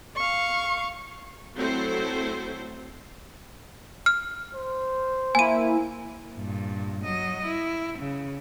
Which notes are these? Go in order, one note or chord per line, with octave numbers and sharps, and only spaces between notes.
F5 C#6
F#3 A3 C4 E4 A4 C5
F6
C5
A#3 E4 G#5 D#7
G2 A#2
F#3 D#5
E4
C#3